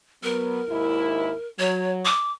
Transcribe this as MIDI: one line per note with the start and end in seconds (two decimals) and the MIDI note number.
0.23 0.60 54
0.23 0.60 59
0.23 1.47 70
0.69 1.31 39
0.69 1.31 44
0.69 1.31 64
1.59 2.06 54
1.59 1.91 73
2.05 2.32 86